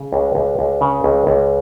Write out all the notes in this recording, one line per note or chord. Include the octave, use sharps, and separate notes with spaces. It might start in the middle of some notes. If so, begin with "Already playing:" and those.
Already playing: C#3
C#2
C#2
C#2
C#3
C#2
C#2